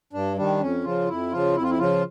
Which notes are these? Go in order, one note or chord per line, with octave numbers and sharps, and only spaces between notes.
G2 D4
D#3 G3 D4
F2 C#4
C#3 F3 F4
F2 E4
C#3 F3 F4
F2 E4
F4
E4
C#3 F3 F4